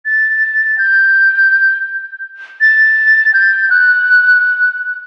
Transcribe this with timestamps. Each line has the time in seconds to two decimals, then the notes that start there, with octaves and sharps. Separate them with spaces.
0.05 A6
0.78 G6
2.61 A6
3.34 G6
3.70 F#6